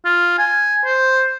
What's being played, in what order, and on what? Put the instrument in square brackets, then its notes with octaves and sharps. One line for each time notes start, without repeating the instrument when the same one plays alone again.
[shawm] F4
G#5
C5